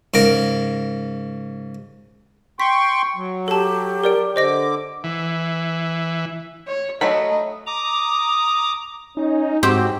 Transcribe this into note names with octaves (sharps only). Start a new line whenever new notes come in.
G#2 C#3 A#4 D6
G5 C6 C#6 B6
F#3
G4 A4 A5
A#4 D5 D7
D3 C5 D#5 D6 A#6
E3
C#5
F#3 A3 D#5 B5
A#5 D6 D#6
C#4 D#4
G#2 C4 F#4 G4